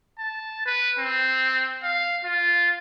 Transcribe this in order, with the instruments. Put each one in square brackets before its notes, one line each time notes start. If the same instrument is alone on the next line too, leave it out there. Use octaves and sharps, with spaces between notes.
[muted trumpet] A5
B4
C4
F5
F4